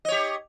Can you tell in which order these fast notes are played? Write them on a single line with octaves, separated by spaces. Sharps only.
D#5 C#5 G4